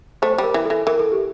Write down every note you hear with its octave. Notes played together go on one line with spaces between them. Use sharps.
A3 C5
C5
G3
A#4
E3
E3 A4
E3 A#4
A4
G4